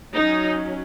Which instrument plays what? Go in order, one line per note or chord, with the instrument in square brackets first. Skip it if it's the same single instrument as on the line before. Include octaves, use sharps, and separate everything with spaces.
[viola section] F#3 C#4 D#4